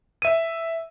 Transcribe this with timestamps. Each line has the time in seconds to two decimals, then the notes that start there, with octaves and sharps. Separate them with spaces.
0.22 E5 D#7